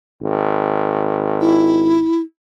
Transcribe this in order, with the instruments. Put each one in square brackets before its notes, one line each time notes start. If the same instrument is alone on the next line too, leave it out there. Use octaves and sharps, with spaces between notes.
[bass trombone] G#1
[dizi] E4